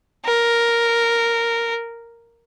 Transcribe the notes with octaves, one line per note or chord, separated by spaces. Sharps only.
A#4